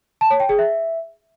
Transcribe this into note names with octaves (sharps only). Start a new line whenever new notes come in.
A5
C#5
G5
G#4
E5